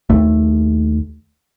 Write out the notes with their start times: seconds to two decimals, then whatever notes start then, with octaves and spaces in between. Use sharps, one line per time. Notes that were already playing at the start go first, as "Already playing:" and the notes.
0.10 D#2 A3